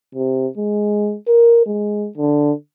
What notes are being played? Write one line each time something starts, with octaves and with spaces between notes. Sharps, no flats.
C3
G#3
A#4
G#3
D3